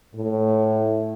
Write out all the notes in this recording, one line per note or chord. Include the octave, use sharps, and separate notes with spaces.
A2